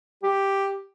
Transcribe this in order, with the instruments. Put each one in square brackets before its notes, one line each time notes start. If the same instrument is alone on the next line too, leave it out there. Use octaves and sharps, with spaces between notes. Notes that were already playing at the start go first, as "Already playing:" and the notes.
[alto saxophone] G4